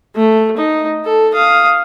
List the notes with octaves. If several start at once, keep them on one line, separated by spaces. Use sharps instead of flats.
A3
D#4
A4
F5 D#6